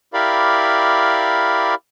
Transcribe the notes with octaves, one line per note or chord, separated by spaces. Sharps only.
E4 G4 A#4 D5 F5 B5